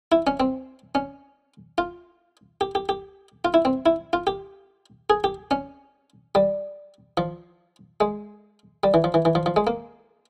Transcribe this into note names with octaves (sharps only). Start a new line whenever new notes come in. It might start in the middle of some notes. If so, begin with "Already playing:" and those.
E4
C#4
C4
C#4
F4
G4
G4
G4
F4
E4
C4
E4
F4
G4
G#4
G4
C#4
G3
F3
G#3
G3
E3
F3
E3
E3
F3
F3
G#3
A#3